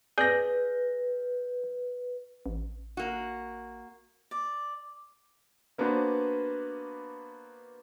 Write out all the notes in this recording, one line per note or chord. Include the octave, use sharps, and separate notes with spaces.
G#4 B4 D5 G6 A#6
A1
A#3 F#4
D5
A#3 B3 D4 F#4 B4 C5